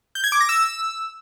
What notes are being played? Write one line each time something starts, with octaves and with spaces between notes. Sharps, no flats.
G6
G#6
D6
A#6
E6